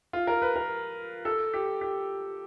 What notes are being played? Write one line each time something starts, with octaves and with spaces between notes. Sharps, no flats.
F4
A#4
B4
A#4
A4
G4
G4